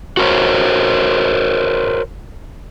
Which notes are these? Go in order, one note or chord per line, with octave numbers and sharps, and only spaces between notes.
F#4 A#4 C5 C#5